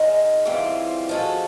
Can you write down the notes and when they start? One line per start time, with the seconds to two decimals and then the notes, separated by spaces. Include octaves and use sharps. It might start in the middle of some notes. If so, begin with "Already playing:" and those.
Already playing: G#2 D#3 G#3
0.45 G#2 E3 G3 C4 F4
1.09 F3 G#3 C#4 F#4 A4